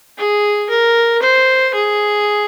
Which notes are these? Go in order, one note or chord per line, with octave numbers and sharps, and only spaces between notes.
G#4
A#4
C5
G#4